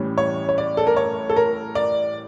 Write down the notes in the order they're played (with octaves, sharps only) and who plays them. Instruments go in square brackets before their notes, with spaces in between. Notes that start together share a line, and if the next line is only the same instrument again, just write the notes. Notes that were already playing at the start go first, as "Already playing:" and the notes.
Already playing: [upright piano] A2 E3 G3 C#4
C#5
C#5
D5
A4
A#4
C#5
A4
A#4
D5